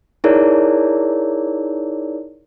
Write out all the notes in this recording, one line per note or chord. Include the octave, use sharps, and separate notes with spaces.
D#4 E4 G#4 A#4 C#5 D5